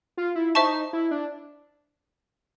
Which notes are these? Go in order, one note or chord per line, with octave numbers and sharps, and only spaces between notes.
F4
E4
D#4 C5 E5 A5 C#6
E4
D4